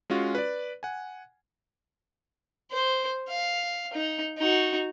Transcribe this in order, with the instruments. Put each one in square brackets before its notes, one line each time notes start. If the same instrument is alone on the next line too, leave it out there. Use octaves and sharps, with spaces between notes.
[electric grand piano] G#3 C#4 F4 F#4
B4 D5
F#5 G#5
[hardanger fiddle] C5
F5
D#4
D#4 F#4